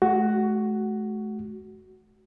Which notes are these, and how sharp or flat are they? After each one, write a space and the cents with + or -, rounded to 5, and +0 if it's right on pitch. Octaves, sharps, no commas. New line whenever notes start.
A3 -45 F#4 +10